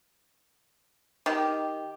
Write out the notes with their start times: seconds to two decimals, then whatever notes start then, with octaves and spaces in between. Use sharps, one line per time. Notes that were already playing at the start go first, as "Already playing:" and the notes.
1.26 D#3 G4